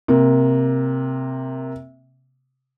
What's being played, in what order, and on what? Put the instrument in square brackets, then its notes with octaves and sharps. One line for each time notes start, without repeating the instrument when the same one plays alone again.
[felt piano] C3 A#3